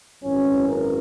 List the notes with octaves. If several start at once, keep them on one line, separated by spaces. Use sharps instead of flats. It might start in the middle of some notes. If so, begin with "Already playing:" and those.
G#1 F#2 E3 C#4
A#4